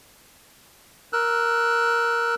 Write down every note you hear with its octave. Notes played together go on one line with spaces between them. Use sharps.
A#4 E6 F#6